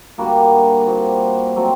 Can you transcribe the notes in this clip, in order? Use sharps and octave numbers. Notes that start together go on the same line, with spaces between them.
D3 G3 A#3 F#4
A#2 G3 C4 F#4
F#3 A3 C4